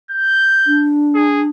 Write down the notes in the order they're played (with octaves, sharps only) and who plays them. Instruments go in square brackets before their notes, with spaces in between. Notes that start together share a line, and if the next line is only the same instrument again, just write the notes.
[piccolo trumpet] G6
[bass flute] D4
[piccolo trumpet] G#4